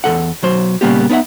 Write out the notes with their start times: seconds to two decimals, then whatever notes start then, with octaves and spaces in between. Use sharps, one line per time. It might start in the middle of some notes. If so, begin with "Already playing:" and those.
0.04 E2 E3 A4 F#5
0.42 B1 F#3 C5
0.81 A#2 C#3 G3 A#3 B3 G4
1.09 B3 D#4 B4 E5 F#5